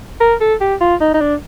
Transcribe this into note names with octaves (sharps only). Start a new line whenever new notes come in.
A#4
A4
G4
F4
D#4
D#4
D4